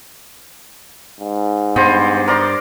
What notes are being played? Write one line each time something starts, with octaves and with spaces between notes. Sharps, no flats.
G#2
G2 B3 C5
A#4 D5 C6